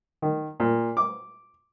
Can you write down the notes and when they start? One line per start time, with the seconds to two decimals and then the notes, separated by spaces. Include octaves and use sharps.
0.22 D#3
0.60 A#2
0.97 D6